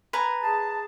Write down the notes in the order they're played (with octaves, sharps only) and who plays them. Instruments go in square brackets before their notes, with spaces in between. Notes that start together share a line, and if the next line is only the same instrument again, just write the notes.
[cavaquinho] B4 G#5 A#5
[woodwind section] G#4 A5